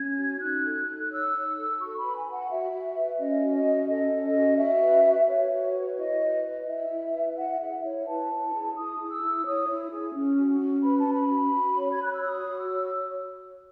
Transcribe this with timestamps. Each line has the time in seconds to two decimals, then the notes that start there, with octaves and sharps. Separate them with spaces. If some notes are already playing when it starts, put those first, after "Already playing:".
Already playing: C#4 G#6
0.16 F#4
0.39 D#4 F#6
0.64 A4
0.87 D#4
0.98 F#6
1.09 C#5 E6
1.32 D#4
1.56 A4
1.79 F#4 C#6
1.96 B5
2.03 B4
2.15 G#5
2.26 B4
2.31 F#5
2.49 F#4 E5
2.72 F#4
2.95 B4
3.18 C#4 D#5
3.42 F#4
3.53 D#5
3.64 C#4
3.88 A4 D#5
4.12 C#4
4.23 D#5
4.35 F#4
4.57 F#4 E5
4.81 B4
5.05 B4
5.27 F#4 C#5
5.51 F#4
5.73 B4
5.97 E4 D#5
6.20 B4
6.44 B4
6.66 E4 E5
6.89 E4
7.13 B4
7.36 E4 F#5
7.59 G#4 E5
7.82 E4 C#5
8.06 B4 A5
8.29 E4
8.52 G#4
8.75 E4 D#6
8.98 G#4
9.10 E6
9.22 E4
9.44 C#5 D#6
9.68 E4
9.91 G#4
10.14 C#4
10.37 F#4
10.61 C#4
10.83 B4 B5
10.97 A5
11.07 C#4 B5
11.30 F#4
11.54 F#4
11.77 C#5
11.92 G#6
12.00 C#5 F#6
12.13 E6
12.23 F#4 D#6
12.46 F#4
12.58 E6
12.69 C#5